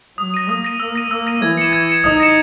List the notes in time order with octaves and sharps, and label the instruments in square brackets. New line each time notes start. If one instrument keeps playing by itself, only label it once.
[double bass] F#3 [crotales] D#6
[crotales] A#6 D#7
[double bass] A#3 [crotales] D#6
[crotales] A#6 D#7
[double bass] A#3 [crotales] E6
[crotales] A#6 D#7
[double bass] A#3 [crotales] E6
[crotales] A#6 D#7
[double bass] E3 [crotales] G#6
[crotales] C#7 E7
G#6
C#7 E7
[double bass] D#4 [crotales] D#6
[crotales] A#6 C#7 E7